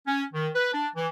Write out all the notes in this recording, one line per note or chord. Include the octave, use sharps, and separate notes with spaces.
C#4
D#3
B4
D4
E3